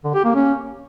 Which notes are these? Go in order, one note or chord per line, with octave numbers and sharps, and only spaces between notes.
D3
G4
A#3
C#4